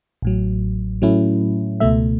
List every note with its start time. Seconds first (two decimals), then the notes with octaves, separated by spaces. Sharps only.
0.22 A1 A2 F#3
1.02 A2 F#3 A3 C#4 E4
1.80 C#2 B2 A3 E5